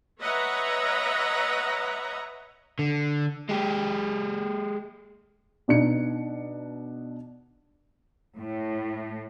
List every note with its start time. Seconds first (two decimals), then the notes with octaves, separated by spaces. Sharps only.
0.20 B4 C#5 D#5 E5 F#5 A#5
2.79 D3
3.49 G#3 G4
5.68 B2 D4 D#4 C#7
8.38 A2